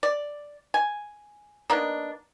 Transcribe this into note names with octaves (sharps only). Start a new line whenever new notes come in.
D5
G#5
A#3 B3 D4 D#4